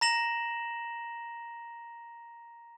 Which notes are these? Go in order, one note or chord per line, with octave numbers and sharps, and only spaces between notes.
A#5 A#6 E7 F#7